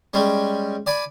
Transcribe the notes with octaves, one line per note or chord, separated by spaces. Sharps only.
G3 G#3 C#4
D5 G#5 B5